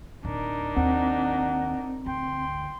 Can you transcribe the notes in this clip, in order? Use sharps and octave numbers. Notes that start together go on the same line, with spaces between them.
D1 D4 D#4 A#4
D#2 C4 F#5
D2 G5 C6